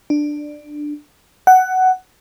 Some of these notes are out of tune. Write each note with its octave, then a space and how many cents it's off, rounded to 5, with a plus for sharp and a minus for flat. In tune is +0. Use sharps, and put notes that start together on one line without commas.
D4 +10
F#5 +10